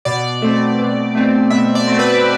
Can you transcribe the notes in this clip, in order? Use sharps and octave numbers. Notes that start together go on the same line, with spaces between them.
B2 D5
A3 C4
B2
A3 C4
B2 E5
D5
A3 C4
B4